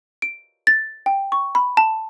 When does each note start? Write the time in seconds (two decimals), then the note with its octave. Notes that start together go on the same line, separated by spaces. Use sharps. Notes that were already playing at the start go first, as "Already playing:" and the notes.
0.22 D7
0.67 A6
1.06 G5
1.32 C#6
1.55 B5
1.77 A5